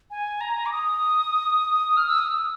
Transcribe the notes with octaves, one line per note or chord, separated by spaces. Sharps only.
G#5
A#5
D6
D#6
F6
E6
D#6
E6